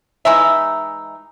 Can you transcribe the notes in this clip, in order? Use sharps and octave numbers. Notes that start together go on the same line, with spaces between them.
E3 G#3 D#4 E5